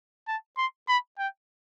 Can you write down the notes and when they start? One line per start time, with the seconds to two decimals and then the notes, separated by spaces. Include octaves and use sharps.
0.27 A5
0.57 C6
0.88 B5
1.19 G5